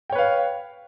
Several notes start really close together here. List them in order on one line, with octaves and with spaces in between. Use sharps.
G5 C#5 B4 F5